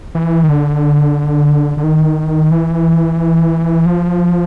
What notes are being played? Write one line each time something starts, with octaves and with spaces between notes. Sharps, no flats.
E3
D#3
D3
D3
D#3
E3
F3